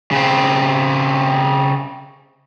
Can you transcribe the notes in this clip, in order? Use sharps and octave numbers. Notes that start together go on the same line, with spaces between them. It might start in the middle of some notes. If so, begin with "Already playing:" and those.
C#3 C4